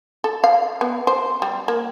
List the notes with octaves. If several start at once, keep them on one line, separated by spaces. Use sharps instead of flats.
A4
F5
B3
C5
G3
A#3